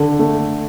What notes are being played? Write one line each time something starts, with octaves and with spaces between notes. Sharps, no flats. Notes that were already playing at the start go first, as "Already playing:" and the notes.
Already playing: D3
A3